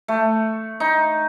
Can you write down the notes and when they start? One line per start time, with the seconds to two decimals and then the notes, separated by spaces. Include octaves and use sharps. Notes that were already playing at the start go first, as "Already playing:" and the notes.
0.08 A3
0.80 D#4